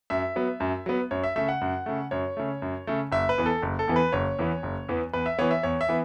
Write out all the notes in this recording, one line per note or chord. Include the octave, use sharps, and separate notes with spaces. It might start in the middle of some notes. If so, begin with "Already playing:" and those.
F#2 E5
F#3 B3
F#2
F#3 B3
F#2 C#5
E5
C#3 A3 E5
F#5
F#2
C#3 A3
F#2 C#5
C#3 A3
F#2
C#3 A3
F#1 E5
B4
E2 E3 B3
A4
F#1
A4
E2 E3 B3
B4
F#1 C#5
E2 E3 B3
F#1
E2 E3 B3
E2 B4
E5
E3 B3 C#5
E5
E2 C#5
E5
E3 B3